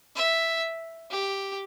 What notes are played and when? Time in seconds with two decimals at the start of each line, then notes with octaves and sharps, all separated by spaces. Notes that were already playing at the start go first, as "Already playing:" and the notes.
0.16 E5
1.11 G4